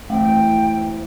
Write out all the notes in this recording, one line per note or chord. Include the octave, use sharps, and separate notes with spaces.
E1 A3 C4 E4 G5